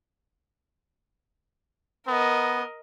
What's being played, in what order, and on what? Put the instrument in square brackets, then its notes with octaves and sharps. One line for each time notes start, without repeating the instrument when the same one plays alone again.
[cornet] B3 [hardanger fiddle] A#4 D#5